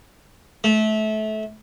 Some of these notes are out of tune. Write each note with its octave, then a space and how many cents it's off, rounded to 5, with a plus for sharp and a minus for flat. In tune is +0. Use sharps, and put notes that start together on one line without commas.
A3 -25